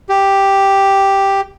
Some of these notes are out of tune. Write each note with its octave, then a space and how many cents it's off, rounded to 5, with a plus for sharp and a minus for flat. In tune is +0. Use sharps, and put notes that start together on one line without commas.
G4 +0